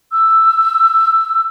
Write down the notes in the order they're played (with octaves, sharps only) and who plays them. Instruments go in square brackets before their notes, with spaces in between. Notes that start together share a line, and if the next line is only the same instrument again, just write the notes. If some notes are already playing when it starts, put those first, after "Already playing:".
[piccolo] E6